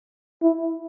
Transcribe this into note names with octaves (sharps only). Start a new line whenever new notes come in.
E4